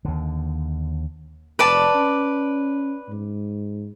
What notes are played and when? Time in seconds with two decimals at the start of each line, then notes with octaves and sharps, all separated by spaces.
0.05 D#2 D3
1.59 F1 B4 D5 A5
1.95 C#4
3.09 G#2